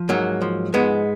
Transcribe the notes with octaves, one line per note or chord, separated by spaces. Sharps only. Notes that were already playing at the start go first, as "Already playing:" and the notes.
Already playing: F3
G#2 F#3 A#3
F3
G#2 G#3 B3